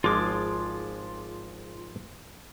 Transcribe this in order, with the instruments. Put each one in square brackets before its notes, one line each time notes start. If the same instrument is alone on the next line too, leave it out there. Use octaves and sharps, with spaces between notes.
[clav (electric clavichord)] G#1 F3 G#3 [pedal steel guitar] F4 D6